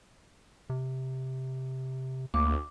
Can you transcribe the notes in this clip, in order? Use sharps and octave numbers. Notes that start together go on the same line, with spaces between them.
C3
D2 A#3 D6